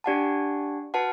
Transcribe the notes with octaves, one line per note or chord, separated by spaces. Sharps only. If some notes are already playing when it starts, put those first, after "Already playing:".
D4 G4 D5 F#5 A5
F#4 B4 F#5 A5